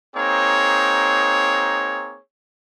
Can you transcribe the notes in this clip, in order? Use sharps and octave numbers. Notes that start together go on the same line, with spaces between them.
A#3 C4 D#4 G#4 C#5